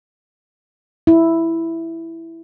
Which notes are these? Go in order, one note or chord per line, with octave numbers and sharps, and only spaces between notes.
E4